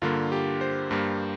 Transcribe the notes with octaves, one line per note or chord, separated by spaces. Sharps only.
G2 D3 A#3 F4
G4
C5
G2 G3 A#3